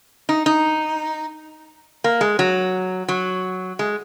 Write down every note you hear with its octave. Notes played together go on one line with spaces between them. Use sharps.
D#4
D#4
A#3
G#3
F#3
F#3
G#3